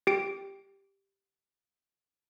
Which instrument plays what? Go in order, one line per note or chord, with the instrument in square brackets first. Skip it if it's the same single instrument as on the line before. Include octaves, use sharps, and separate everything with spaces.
[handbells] G4 D7